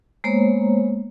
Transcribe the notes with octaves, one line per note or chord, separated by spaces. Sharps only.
G#3 A#3 B3 C5 C#5 A#5